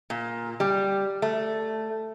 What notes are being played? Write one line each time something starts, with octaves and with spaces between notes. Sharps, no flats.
A#2
G3
A3